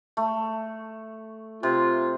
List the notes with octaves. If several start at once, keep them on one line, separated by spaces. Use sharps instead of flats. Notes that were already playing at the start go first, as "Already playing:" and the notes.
A3
C3 F4